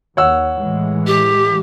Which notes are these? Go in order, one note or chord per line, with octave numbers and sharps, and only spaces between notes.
D#2 C#5 F#5 E6
A2 E3 G#3
G4